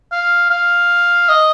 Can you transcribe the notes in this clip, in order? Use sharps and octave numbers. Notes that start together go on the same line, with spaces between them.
F5
F5
D#5